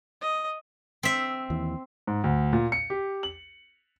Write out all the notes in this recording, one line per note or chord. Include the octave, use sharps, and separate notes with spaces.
D#5
C4 E5
D#2 E3
G#2
D2
A#2
C#7
G4
F#7